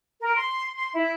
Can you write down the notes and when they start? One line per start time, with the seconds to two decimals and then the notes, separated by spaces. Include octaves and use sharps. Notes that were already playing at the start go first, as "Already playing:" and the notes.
0.21 A#4
0.36 C6
0.75 C6
0.94 E4